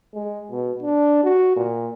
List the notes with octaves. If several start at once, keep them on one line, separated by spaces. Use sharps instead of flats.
G#3
B2
D4
F#4
A#2